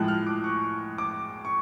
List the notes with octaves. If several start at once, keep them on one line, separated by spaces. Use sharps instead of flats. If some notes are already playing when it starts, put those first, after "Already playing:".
Already playing: A2 F3 G#3 F#6
F6
D6
C#6
D6
C#6